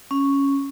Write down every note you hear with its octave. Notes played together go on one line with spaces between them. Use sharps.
C#4